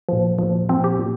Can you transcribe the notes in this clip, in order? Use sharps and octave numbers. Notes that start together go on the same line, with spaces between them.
A#2 F3
A#2 F3
A#2 F3 C4
G4
A#2